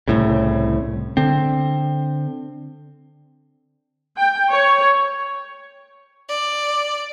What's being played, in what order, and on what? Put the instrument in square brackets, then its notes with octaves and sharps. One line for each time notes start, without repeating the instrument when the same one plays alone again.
[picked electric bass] C2 A2 C#3
D3 C4
[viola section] G5
C#5
[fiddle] D5